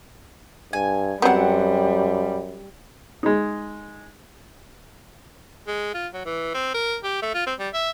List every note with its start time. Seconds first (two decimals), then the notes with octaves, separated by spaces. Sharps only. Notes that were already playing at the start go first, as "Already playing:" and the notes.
0.73 G2 G#5
1.22 F#2 F#3 G3 B3 C4 F#5
3.23 G#3 D#4
5.67 G#3
5.94 F4
6.14 F#3
6.25 E3
6.54 C4
6.74 A#4
7.03 G4
7.22 A3
7.34 F4
7.47 C4
7.59 G3
7.74 E5